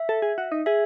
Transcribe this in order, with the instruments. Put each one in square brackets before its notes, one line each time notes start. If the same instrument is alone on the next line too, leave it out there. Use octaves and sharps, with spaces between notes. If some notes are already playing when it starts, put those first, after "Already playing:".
Already playing: [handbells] E5
[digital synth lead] A4
G#4
F#4
D#4
[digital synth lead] G#4 [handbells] E5